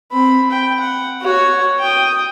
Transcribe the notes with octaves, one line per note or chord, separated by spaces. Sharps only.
C4 B5
G5
F#5
F#4 C#5
G5 D#6